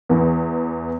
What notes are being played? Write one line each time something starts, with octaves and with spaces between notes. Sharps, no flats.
E2 E3